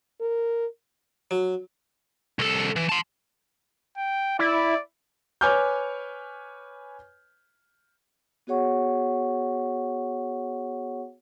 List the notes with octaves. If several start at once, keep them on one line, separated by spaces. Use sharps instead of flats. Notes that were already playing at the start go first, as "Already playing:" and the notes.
A#4
F#3
C2 A4
E3
A5 C6
G5
E4 D5
B4 C#5 G#5 D6 F6 G6
B3 F#4 G#4 C#5 F#5 C#6